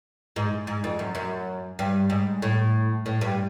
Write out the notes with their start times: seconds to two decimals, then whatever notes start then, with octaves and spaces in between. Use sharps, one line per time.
0.36 G#2
0.67 G#2
0.84 F2
0.99 F#2
1.15 F#2
1.79 G2
2.10 G#2
2.42 A2
3.06 A2
3.21 G2